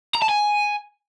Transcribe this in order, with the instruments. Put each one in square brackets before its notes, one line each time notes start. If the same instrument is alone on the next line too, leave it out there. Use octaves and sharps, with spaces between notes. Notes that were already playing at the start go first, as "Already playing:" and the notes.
[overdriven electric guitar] A#5
A5
G#5